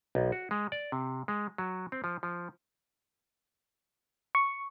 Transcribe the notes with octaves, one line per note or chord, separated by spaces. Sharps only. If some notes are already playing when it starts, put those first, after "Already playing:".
B1
F#4
G#3
D5
C3
G#3
F#3
C4
F3
F3
C#6